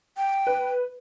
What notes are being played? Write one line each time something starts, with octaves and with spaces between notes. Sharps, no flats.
G5
B4